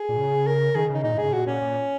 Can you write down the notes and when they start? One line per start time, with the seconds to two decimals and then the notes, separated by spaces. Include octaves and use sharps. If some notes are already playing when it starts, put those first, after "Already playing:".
Already playing: G#4
0.09 A#2
0.17 C#3
0.47 A#4
0.75 D#3 G#4
0.90 C#3 D#4
1.04 A#2 D#4
1.14 G#2
1.18 G#4
1.23 C#3
1.33 A#2 F#4
1.47 A#2 C#4
1.62 A#2